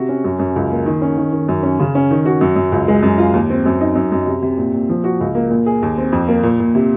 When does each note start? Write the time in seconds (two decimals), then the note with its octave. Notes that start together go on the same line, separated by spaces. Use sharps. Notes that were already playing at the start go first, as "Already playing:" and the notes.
Already playing: C3 F#4
0.09 C#4
0.24 F#2
0.39 F#2
0.56 C#2
0.71 A#3
0.86 D#3
1.02 C#4
1.18 D#3
1.32 D#3
1.49 F#2
1.63 C#4
1.80 C#3
1.95 C#4
2.11 D#3
2.25 F#4
2.41 F#2
2.56 F#2
2.72 C#2
2.88 G#3
3.03 F#2
3.18 F4
3.33 D#2
3.50 C4
3.66 F#2
3.81 D#4
3.95 F#2
4.12 F#2
4.27 C3
4.42 C3
4.58 A#2
4.74 A#2
4.89 F3
5.04 F#4
5.20 C#2
5.35 A#3
5.51 A#2
5.66 G#4
5.82 D#2
5.98 C4
6.13 F2
6.28 A#3
6.43 A#2
6.60 A#2
6.75 C3